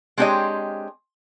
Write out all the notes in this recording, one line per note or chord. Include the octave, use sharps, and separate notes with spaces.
G#3 C4 D4 G4 C#5 D#5